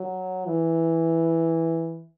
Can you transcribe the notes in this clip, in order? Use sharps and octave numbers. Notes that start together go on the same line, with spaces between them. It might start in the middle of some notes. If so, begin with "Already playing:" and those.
Already playing: F#3
E3